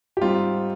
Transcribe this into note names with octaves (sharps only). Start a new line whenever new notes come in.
G4
G#2 G3 C4 D#4 F4